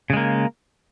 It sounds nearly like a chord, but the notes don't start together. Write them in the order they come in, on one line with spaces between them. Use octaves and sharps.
C#3 G#3 A#3